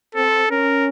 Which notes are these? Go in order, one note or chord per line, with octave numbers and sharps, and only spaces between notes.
C4 A4
C#4 A#4